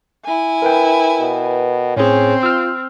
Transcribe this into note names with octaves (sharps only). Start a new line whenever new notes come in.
E4 G#5
A#4 B4 G5
B2
A2 C4 C#4 G#4
F4 E6 F6